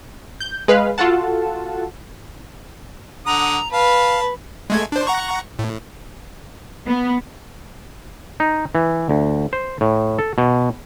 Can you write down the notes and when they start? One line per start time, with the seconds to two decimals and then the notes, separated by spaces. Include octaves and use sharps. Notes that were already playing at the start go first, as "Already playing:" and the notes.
0.40 G6
0.68 G#3 B4 F5
0.98 F4 F#4 A4 F#5 A5
3.26 D3 F#5 A#5 D#6
3.72 B4 F5 A5
4.70 G#3 A3 G#6
4.92 D4 C5
5.07 F#5 A#5 C#6
5.59 A2
6.88 B3
8.40 D#4
8.75 E3
9.09 D2
9.53 C5
9.81 A2
10.19 A4
10.38 B2